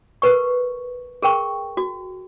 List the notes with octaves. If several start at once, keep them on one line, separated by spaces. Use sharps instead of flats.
A#4 B4 C#6
G#4 A#4 G5 C#6
F#4